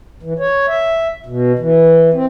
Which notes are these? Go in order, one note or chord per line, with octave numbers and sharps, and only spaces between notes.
E3
C#5
E5
B2
E3
C4